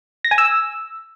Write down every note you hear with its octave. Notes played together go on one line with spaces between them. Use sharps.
A#6
G#5
E6